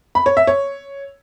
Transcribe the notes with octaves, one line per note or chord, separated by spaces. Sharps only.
B5
C#5
E5
C#5